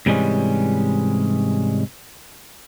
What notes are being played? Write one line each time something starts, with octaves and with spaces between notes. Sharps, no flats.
G#2 C3 E3 G3 G#3 C#4